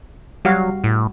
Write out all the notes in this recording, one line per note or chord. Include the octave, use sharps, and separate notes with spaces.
F#3 G3 F#4 F5
A2